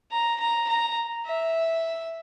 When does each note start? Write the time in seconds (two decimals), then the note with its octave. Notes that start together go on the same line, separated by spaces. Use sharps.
0.11 A#5
0.40 A#5
0.68 A#5
1.26 E5